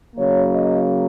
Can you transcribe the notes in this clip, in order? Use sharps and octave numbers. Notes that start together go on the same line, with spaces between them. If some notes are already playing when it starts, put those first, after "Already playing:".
C#3 F#3 A#3 C#5
D#5